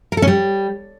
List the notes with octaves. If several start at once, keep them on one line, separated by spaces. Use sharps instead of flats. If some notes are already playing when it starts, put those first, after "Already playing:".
A#4
A4
C#4
G3